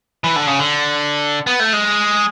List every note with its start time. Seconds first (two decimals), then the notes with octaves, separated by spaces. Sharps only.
0.24 E3
0.36 D3
0.47 C#3
0.59 D3
1.47 B3
1.60 A3
1.73 G#3